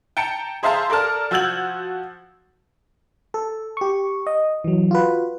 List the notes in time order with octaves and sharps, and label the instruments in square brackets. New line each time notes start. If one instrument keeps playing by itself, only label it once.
[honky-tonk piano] G5 A5 A#5 C#7
G#4 C5 E5 F5 A5 A#5
A4 A#4 D5 A5 F6
F3 F#4 E6 G6 G#6 F#7
[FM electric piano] A4
G4 C#6
D#5
E3 F#3
F4 F#4 B4